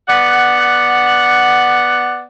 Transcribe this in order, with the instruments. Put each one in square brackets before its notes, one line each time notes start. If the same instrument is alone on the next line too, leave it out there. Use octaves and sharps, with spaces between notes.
[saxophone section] B3 D5 F#5